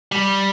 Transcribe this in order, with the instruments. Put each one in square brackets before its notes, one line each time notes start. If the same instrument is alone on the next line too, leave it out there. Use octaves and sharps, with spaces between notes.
[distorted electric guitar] G3